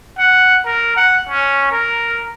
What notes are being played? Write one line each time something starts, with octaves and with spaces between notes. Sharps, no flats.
F#5
A#4
F#5
C#4
A#4